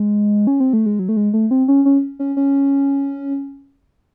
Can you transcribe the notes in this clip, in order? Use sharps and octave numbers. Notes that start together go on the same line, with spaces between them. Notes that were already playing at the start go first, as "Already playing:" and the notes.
Already playing: G#3
C#4
C4
A3
G#3
F#3
A3
G#3
A3
C4
C#4
C#4
C#4
C#4